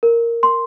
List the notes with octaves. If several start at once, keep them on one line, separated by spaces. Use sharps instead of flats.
A#4
C6